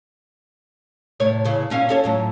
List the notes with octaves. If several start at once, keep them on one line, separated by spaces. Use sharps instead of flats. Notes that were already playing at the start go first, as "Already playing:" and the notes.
A2 C3 C#5
A#2 C#3 E3
A#2 C#4 F5
C#4 A4 C#5
F2 A2 F#3